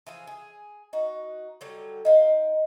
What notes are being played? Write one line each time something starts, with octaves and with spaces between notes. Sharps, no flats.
E3 F3 G#4
G#4
D#4 F#4
D3 F#3 G3
D#4 F5 G5